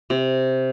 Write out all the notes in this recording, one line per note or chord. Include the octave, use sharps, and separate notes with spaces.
C3